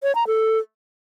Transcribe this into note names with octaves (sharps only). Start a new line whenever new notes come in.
C#5
A#5
A4